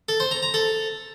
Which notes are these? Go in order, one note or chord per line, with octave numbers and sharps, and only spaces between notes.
A4
C5
A#5
A#5
A4